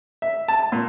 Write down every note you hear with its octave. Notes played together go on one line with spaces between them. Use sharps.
E5
A5
A#2